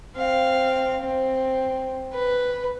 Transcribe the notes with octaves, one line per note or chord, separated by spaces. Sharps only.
C4 F5
C4
B4